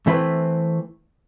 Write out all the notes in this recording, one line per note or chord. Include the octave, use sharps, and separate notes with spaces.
E3 A3 C4 E4 B4